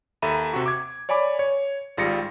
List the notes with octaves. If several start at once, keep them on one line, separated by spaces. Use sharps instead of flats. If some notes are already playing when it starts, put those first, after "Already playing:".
D#2 A4 E5 A#5 B5 D#7
C3 F#4
D6 G#6
C#5 D5 G#5 B5 D6
C#5
G#1 G3 F4 G#4 A#6 C#7